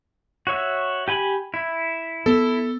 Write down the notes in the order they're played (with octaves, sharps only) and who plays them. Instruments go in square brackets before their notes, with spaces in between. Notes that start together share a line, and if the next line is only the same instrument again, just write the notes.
[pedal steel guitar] F#4 C#5 E5
G4 G#5 B5
E4
[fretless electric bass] B3 [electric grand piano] A4